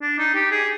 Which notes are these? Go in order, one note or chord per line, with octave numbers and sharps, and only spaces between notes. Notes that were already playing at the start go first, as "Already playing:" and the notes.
D4
D#4
G4
G#4